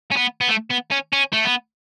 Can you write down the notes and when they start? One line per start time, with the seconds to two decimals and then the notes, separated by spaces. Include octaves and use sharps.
0.11 C#4
0.16 B3
0.41 B3
0.48 A3
0.70 B3
0.91 C#4
1.13 C#4
1.33 A3
1.45 B3